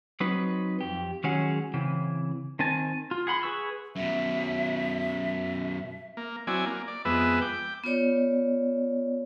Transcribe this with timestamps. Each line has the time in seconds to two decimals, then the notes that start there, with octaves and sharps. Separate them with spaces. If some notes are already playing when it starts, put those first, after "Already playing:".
0.20 F#3 C4 D#4 B4
0.81 F2 G4
1.24 D#3 F#3 G#3 C#4 G#4 F#5
1.74 C#3 E3 C4
2.59 D#3 C4 G#5 A5
3.11 F4
3.27 G#4 F#5 B5 C6
3.43 G#4 B4 C#6 E6
3.96 F#2 B2 E5
6.17 A#3
6.47 F#3 C4 E4 D5 G#5
6.66 A#3
6.88 D5
7.05 F2 G#3 B3 B4 E5
7.42 G5 D6
7.84 B3 F4 C#5 D5